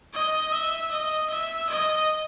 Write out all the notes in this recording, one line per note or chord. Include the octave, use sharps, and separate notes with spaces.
D#5
E5
D#5
E5
D#5